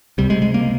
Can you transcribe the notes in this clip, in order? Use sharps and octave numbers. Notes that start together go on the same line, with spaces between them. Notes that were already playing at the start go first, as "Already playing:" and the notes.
C#2 C3 G3
G#3
G#3
A#3